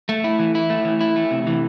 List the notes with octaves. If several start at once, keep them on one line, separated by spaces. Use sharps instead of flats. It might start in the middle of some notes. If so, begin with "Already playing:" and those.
A3
E4
E3
E4
A3
E3
E4
A3
C3
E3